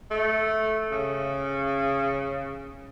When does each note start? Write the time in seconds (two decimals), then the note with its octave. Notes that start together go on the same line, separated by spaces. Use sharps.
0.11 A3
0.92 C#3